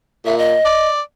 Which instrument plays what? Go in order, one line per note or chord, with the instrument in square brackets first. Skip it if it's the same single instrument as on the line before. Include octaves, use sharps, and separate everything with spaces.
[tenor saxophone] A#2 [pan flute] E5
[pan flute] D#5
[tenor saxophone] D5